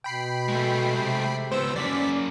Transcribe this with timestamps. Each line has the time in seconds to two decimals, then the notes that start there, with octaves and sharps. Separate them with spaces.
0.04 B2 G5 B5 C7
0.48 G#3 A3
0.96 C3
1.52 C#2 B3 C5 E6
1.76 F#2 A#3 C#4 D5 B6